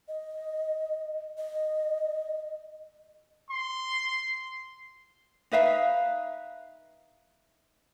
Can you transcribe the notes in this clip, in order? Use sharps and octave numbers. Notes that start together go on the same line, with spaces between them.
D#5
D#5
C6
D#4 B4 E5 F5